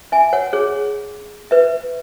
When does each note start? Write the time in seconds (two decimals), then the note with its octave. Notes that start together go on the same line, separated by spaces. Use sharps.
0.12 E5 G#5
0.33 C#5 F#5
0.53 G#4 C#5
1.51 B4 E5